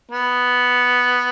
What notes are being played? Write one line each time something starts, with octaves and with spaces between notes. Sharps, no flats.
B3